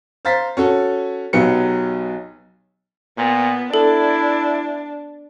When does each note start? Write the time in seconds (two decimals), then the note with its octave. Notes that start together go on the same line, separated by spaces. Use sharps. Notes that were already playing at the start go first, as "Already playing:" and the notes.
0.25 C5 F5 A#5 A6 B6
0.57 C#4 F#4 A4
1.33 B1 F#3 B3 G4 C#7
3.17 A#2 B3
3.74 D4 E4 A4